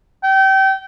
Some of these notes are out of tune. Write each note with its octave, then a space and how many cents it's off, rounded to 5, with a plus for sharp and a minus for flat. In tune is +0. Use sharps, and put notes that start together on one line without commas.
G5 -30